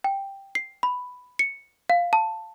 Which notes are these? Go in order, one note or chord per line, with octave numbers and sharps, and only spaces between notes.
G5
C7
B5
C#7
F5
A5